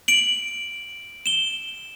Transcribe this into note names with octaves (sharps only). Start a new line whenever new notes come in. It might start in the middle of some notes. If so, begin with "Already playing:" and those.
D7 F#7
E7 G7